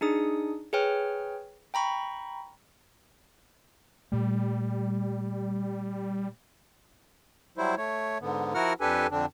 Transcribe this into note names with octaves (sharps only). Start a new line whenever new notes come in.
D4 D#4 G#4 D#6
G#4 B4 C#5 G5 F6
G5 A#5 B5 C#6
A#2 G3 A3
F#3 G3 E4 C5
A3 C#5
G#2 D3 B3
F3 E4 F#4 A#4 F#5 F6
F2 D4 G4 A4 B4 G#5
F2 D3 C4 D4